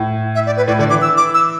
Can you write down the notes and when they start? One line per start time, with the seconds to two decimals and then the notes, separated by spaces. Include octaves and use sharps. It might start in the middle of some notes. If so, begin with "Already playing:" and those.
Already playing: A2
0.35 E5
0.46 D5
0.57 B4
0.68 A2 D5
0.79 D3 D5
0.90 E3 D6
1.02 E6
1.17 D6
1.34 E6